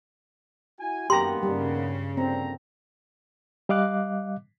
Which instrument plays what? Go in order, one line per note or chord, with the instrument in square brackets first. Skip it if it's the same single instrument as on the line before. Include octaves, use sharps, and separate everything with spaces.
[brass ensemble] E4 F#4 G#5
[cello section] F#2 [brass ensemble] D#3 A#3 B3 [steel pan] G4 A#5 [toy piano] C6
[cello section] G2 C#3 [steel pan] G3
[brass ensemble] A#2 D3 A#5 [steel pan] C4
[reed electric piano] G3 D#5 F5 D6 F#6